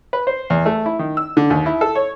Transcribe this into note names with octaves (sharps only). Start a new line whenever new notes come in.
B4
C5
E2
A3
E4
D#3
E6
D3
D#2
E4
A4
C#5